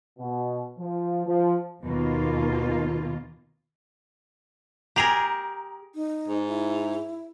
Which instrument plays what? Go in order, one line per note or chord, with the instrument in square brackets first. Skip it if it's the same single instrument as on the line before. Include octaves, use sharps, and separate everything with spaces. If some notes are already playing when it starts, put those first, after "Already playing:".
[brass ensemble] B2
F3
F3
[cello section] D#2 B2 D#3 A#3 F4
[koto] G4 G#4 A#4 [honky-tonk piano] A#5 F7
[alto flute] D#4
[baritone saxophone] G#2
[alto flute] E4